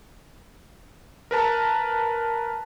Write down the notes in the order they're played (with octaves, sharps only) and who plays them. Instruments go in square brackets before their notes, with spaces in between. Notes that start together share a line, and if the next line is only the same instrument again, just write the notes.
[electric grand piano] A#4 B4 A5 A#5